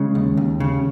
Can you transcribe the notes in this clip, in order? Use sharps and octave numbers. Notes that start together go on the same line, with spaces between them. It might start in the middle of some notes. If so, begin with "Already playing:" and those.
Already playing: C#3 G#3 C#4
D#2
D#2
C#3